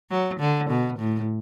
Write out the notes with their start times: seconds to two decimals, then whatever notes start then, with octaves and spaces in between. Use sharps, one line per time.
0.10 F#3
0.40 D3
0.69 B2
0.99 A2